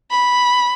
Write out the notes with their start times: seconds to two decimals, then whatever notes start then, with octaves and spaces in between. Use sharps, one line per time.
0.11 B5